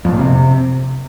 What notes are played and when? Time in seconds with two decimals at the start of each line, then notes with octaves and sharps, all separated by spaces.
0.05 F2
0.12 A#2
0.19 C3